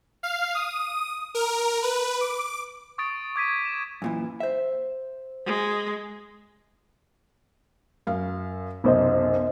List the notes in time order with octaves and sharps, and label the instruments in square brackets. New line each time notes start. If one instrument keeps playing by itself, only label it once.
[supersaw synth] F5
D#6
A#4
B4
D6
[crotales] C#6 D#6 A6 D7
D6 G#6 B6 D#7
E7
[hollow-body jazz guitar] F#2 A#2 E3
C5 E5
[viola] G#3
[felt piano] F#2 F5
[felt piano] B1 F#2 C3 [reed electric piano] B3 C5 D#5